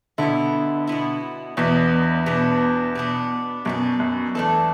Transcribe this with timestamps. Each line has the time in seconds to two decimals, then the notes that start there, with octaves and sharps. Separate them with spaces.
0.18 B2 D3 B3 E4
0.87 B2 B3 E4
1.57 E2 B2 B3 D4
2.26 B2 B3 D4
2.95 B2 B3 D4
3.65 F#2 B2 B3 D4
4.00 F#2
4.34 E2 A3 D4 A4